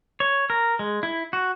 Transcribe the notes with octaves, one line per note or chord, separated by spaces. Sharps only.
C#5
A#4
G#3
E4
F#4